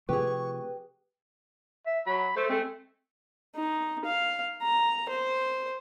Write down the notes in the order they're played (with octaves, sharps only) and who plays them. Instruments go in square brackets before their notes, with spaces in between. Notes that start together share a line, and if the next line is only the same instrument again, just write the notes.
[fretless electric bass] C3 F3 A3 [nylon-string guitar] G4 G#4 [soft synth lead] B4 [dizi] C#6
[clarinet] E5
[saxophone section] F#3 [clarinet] B5
[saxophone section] A3 [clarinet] C5
[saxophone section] G#3 A3 [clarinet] C4
[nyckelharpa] D#4
F5
A#5
C5